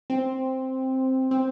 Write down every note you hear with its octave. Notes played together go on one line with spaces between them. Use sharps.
C4
C4